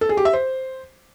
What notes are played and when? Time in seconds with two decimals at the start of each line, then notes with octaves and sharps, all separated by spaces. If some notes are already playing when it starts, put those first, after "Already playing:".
0.01 A4
0.09 G#4
0.17 G4
0.25 E5
0.33 C5